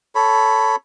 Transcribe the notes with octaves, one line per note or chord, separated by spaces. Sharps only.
A4 C#5 B5